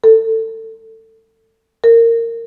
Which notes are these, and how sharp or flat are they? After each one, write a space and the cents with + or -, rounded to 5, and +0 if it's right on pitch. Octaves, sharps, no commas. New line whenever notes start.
A4 +25
A#4 -20